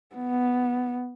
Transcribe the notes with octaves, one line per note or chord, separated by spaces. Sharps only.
B3